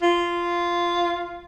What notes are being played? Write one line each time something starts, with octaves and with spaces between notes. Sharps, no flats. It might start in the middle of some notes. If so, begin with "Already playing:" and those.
F4